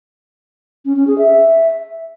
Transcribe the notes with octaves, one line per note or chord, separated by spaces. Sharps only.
C#4
C#4
G#4
E5